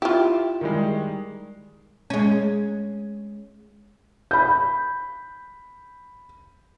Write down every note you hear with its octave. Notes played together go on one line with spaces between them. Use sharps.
E4 F4 G4
D#3 G3 G#3
G#3 C#4
B5 G6